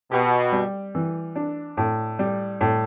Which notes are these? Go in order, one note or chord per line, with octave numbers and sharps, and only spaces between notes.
B2 G4
G3
E3
D4
A2
G3
A2